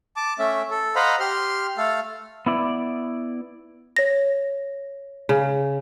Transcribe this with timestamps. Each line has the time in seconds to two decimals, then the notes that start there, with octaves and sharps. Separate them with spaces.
0.16 A5 D6
0.39 A3 C#4 E5
0.71 A4
0.96 C5 D#5 F5 F#5 A#5 B5
1.20 G4 C6 F6
1.77 A3 A4 F5
2.46 B3 E4 D5
3.97 C#5 A#6
5.29 C#3